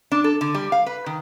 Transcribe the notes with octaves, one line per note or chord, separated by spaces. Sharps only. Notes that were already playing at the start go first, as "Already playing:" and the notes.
D4
A4
D3
G3
F5
B4
D#3